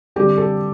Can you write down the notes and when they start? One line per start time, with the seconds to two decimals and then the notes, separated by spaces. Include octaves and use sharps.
0.16 D3 G3 C4 G4
0.37 A4